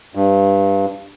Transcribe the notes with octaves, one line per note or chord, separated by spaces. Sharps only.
G2